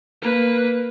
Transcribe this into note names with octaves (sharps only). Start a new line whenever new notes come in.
A#3 B4